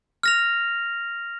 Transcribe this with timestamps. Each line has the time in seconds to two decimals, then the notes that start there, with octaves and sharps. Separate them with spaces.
0.23 F6 A#6 F7